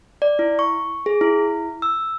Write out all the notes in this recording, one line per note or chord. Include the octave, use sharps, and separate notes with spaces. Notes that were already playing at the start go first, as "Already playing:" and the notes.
D5
E4
C#6
G#4
E4
E6